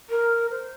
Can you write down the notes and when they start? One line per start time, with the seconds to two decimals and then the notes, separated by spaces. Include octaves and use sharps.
0.10 A#4
0.50 C5